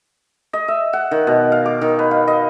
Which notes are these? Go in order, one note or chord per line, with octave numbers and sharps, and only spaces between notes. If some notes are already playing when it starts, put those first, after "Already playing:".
D#5
E5
F#5
D#3
B2
F5
D6
D#3
B4
F5
D#5